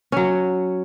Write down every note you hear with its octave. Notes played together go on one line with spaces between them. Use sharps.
F#3 C#4